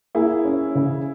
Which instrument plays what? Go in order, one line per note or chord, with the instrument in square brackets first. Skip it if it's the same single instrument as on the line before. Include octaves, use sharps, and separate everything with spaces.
[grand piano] A#3 [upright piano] E4 G#4
[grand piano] C#4
C#3